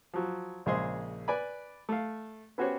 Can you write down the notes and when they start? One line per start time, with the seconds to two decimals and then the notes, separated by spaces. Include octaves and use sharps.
0.14 F3 F#3
0.66 A#1 C#3 G#3 G#4 C5 C6
1.28 B4 D5 G#5 B5
1.89 A3 F5
2.58 B3 C#4 F#4 G4 C5 C#5